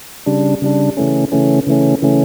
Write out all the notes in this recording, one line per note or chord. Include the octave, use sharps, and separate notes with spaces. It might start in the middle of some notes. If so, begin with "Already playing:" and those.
C#3 G3 D4
C#3 G3 D4
C#3 E3 A3 C#4
C#3 E3 A3 C#4
C#3 E3 A3 C#4
C#3 E3 A3 C#4